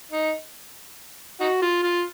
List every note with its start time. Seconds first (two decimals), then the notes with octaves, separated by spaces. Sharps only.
0.11 D#4
1.40 D#4 F#4
1.62 F4
1.83 F4